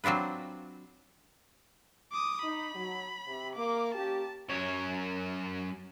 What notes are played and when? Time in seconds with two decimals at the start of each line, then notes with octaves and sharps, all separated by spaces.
0.04 F#3 C4 D4 F4 B4
2.12 D6 D#6
2.43 D#4 B5
2.73 F#3
3.26 C3
3.56 A#3 D6
3.95 A#3 C#4 G4 A5
4.49 F#2 C#5